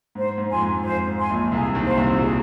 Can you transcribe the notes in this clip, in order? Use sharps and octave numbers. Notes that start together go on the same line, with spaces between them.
G#2 C5
G#2
F2 G#5 C6
G#2
F2 C5
G#2
G#5 C6
A#1 A#2
C2 C3 G#4
D#2 D#3
C5 F5
C2 C3
A#2
G#4